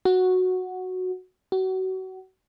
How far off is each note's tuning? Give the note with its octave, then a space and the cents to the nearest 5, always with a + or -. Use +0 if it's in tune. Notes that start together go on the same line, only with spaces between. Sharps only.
F#4 -5
F#4 +30